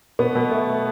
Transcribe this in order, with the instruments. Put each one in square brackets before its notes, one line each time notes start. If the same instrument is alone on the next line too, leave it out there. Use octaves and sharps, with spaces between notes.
[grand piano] B2 B3
B2
A3